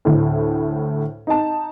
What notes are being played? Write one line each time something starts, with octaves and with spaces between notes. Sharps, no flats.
D2 A2
D#4 A5